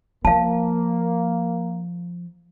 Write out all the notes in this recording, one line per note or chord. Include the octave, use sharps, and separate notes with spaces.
F3 A#3 F5 A5